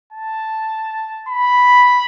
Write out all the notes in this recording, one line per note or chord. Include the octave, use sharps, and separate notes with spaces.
A5
B5